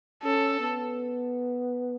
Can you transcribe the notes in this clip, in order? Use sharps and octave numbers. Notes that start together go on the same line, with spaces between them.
C#4 A4
B3